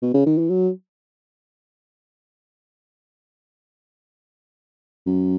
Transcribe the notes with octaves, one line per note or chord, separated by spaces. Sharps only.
B2
C#3
D#3
E3
F#3
F#2